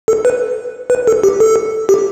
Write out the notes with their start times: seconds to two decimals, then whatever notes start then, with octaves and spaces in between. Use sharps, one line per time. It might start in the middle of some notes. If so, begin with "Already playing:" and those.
0.08 A4
0.25 B4
0.90 B4
1.07 A4
1.23 G4
1.40 A4
1.89 G4